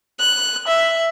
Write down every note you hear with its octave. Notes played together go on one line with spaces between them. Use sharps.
F#6
E5